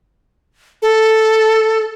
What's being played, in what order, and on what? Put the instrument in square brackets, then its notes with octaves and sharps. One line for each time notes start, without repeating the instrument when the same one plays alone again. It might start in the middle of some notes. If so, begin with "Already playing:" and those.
[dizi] A4